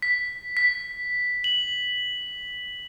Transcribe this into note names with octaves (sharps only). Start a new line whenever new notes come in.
B6
B6
F#7